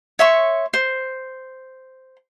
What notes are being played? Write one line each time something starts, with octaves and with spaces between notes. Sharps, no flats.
C#5 E5 C6 C#6
C5